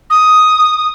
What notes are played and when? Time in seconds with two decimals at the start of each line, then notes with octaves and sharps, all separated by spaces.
0.10 D#6